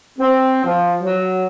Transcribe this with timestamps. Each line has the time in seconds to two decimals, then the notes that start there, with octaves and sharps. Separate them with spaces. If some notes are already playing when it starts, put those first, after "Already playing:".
0.19 C4
0.65 F3
1.03 F#3